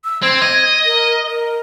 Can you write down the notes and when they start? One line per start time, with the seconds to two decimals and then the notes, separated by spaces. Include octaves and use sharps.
0.05 E6
0.23 C4 G#6
0.42 D#5
0.85 A#4
1.27 A#4